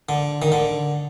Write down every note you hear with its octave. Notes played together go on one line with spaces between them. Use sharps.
D3
D#3
D3